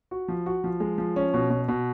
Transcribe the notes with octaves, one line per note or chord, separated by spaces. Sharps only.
F#4
F3
F#4
F3
G#3
F3
C#4
B2
B2
B2